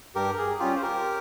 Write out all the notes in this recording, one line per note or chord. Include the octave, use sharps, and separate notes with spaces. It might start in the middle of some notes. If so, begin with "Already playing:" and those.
G2 G4 A#4
G#4
G3 C#4 F4 G4
C5
G4 A#4